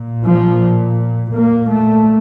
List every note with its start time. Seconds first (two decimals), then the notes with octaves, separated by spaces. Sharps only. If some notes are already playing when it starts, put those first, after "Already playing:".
Already playing: A#2
0.25 F3
1.34 A#2 A#3
1.70 A3